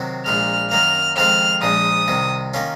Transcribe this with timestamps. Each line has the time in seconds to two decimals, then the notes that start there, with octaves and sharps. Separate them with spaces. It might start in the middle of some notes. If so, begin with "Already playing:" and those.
Already playing: C3 D#3 F#3 C4
0.26 A#1 A#2 G#3 F6
0.71 F#2 D#3 A#3 F6
1.17 F2 D#3 G#3 C4 F4 F6
1.62 A#1 A#2 F3 G#3 D#6
2.08 C2 C3 D#3
2.54 D#3 A#3 C#4 F4